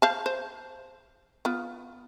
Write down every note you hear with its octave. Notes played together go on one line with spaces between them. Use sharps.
C5 F5 A5
C5
B3 F4